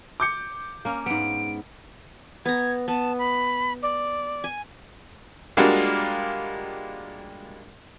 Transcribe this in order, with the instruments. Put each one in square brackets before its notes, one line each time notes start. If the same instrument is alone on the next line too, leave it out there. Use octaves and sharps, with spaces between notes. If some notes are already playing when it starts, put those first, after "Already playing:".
[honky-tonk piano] D6 G6 C#7
[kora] A#3 C#4
[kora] G#2 B3 [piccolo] D7
[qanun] B3 A#5 [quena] G#6
[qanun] B3 [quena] A5
[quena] B5
D5
[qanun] G#5
[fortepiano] G3 G#3 A#3 D4 F4 F#4